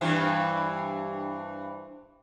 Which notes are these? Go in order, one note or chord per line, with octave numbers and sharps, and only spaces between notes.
G2 E3 C4